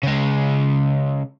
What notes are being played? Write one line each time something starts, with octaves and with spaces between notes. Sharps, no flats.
C#3 G#3